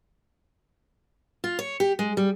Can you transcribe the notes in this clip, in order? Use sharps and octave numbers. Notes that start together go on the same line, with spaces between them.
F4
C#5
G4
G#3
G3